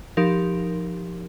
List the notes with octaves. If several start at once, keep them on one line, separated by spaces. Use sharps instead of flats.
F3 D#4 G4 A#4